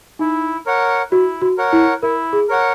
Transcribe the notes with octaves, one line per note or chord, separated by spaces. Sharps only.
D#4 E4
A#4 C#5 F#5
E4 F#4
F#4
A#4 C#5 F#5
E4
E4 A#4
G#4
A#4 C#5 F#5